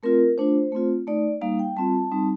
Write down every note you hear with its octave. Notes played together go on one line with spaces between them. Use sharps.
A3 C4 F4 A#4
A3 D4 F4 C5
A3 C4 F4
A3 D#4 D5
G3 A#3 D#4 F5
G5
G3 C4 F4 A5
G3 C4 D#4